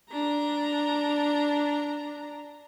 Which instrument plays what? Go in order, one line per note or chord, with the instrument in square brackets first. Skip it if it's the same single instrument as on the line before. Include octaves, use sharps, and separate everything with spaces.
[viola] D4 A#5